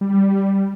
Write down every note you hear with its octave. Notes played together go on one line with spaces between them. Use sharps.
G3